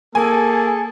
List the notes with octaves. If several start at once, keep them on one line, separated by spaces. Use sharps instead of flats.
A#3 G#4 A4 G#5